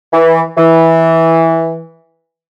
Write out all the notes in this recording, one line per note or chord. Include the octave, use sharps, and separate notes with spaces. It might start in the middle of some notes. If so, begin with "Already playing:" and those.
E3
E3